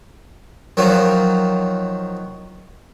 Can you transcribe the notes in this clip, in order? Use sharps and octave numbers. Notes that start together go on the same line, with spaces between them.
D#3 F3 F#3